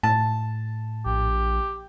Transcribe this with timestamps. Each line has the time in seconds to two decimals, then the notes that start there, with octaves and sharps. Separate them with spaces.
0.03 A2 A5
1.06 A#1 G4